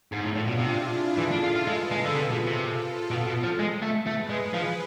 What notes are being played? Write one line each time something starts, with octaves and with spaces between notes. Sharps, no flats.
G#2
A2 D4 F4
A2
B2
C3
E4 G#4
E3 F4 A4
D4
F4
F4
G#3 G#4 B4
G#3
D3
C3
B2
C3
F4 A4
B2
B2
F3
G#3
A3
A3 G#4 B4
G#3
F3